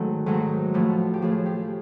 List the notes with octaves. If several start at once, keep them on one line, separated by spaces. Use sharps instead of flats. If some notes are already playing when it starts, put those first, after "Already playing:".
Already playing: G#2 D#3 F#3 A3 C#4 A4
G#2 D#3 F#3 A3
A2 F3 A3
G4
A2 F3 A3 G#4
G4